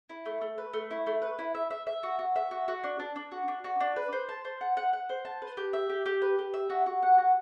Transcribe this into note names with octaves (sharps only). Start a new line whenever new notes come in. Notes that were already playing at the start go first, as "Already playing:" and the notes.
E4
A3
A3
B4
A3
E4
A3
B4
E4
E5
E5
E5
F#4
F#4
E5
F#4
F#4
D4
D4
D4
F#4
D4
F#4
D4
B4
C5
A5
C5
F#5
F#5
F#5
C5
A5
B4
G4
E5
G4
G4
B4
G4
E5
F#4
F#4
F#5
F#4